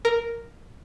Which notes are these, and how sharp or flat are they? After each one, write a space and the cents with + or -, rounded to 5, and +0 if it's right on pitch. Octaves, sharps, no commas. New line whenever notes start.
A#4 +0